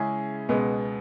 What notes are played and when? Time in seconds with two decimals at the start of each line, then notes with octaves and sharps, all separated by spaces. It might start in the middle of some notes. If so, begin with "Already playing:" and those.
Already playing: C#3 G#3 C#4 E4 G#4
0.49 C#2 B2 G#3 B3